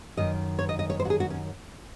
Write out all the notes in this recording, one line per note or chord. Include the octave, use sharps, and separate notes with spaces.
F#2 D#3 D#5
C#5
D#5
D#5
C#5
C5
F#4
G#4
F#4
C#4